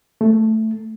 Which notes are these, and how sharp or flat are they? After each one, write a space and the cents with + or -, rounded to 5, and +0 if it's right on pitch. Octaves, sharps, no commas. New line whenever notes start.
A3 +5